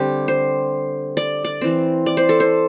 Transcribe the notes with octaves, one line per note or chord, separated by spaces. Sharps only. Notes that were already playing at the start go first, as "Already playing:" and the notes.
Already playing: D3 G3 C4 G4
C5
D5
D5
E3 C4
D5
C5
A4
C5